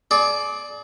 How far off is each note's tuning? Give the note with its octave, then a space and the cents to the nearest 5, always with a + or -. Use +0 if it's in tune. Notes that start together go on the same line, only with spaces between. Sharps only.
G#4 +40 D5 +0